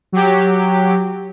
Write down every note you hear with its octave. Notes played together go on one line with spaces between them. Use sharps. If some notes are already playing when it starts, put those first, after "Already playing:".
F#3 G4